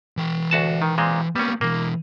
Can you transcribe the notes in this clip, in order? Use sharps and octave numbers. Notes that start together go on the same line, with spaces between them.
E3 G5
D2 F#4 A5
D#3
A#2 G#3 C4
G3 A#3 B3 C#4
B2 E3 A#3